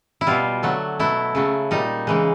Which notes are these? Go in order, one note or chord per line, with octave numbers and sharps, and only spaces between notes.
E4
B2 G3 F4
D3 F#3 A3
B2 F#3 A3 E4
C#3 F#3 A3
A#2 G3 D#4
C#3 E3 G#3